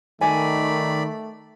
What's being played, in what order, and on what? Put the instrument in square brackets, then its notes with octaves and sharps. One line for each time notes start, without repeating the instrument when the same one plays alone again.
[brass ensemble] D#3 [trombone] A3 [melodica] D5 B5 [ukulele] G#5